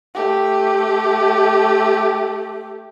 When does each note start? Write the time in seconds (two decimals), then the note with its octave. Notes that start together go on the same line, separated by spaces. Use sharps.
0.15 A3 G4